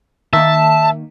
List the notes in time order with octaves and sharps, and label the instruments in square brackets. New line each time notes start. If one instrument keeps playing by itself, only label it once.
[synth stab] D#3 A#3 [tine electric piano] E5 [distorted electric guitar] A5